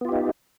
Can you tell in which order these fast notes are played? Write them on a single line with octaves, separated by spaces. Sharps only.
B3 F4 G4 D#4